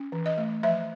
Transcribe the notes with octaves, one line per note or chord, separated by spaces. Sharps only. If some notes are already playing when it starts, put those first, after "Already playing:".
Already playing: C#4
E3
D#5
A3
F3 E5